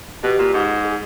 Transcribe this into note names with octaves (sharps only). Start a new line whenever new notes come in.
B2 G4
A#2
G#2
G#4